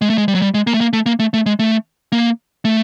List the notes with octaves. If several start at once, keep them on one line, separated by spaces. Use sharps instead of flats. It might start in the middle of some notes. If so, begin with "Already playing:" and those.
G#3
A3
G#3
G3
F#3
G3
G#3
A#3
A3
A#3
A3
A#3
A3
A3
G#3
A3
A#3
A3